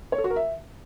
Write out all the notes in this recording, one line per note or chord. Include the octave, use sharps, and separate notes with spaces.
C#5
A4
F#4
A#4
E5